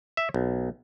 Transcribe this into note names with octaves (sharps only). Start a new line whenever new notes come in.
E5
B1